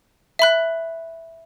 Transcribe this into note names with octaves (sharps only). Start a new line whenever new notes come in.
E5 B5 F#6